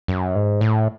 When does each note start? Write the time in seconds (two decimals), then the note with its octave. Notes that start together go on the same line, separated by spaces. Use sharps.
0.08 F#2
0.35 G#2
0.61 A2